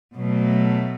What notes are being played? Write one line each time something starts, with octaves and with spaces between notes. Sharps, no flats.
B2 F#3 A3